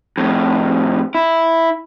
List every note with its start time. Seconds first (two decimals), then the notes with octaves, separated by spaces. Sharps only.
0.18 F2 A2
1.15 E4